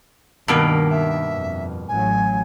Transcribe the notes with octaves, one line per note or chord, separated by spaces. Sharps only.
G2 B2 D#3 A#3
E5
F2
A1 F#3 G#5